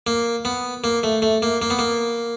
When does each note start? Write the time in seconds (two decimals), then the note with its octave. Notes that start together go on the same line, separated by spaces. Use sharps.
0.07 A#3
0.45 B3
0.84 A#3
1.03 A3
1.22 A3
1.42 A#3
1.62 A#3
1.70 B3
1.79 A#3